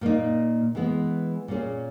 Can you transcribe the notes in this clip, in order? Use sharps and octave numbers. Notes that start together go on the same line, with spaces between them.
A#2 A#3 D#4
E3 G#3 B3
A#2 A#3 C#4 G#4